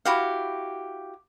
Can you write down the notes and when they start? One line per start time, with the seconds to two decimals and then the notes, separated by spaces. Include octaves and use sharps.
0.05 E4 F#4 G4 F5